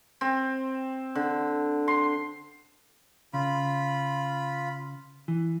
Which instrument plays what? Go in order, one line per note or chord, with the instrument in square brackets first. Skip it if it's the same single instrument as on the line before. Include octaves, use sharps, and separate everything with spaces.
[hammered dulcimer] C4
D3
C6
[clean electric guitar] C#3 [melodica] F4 B5
[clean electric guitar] E3